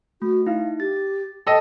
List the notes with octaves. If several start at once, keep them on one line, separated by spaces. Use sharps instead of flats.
A3 F#4
D#4 E4 F5
G4 A6
A4 D#5 G5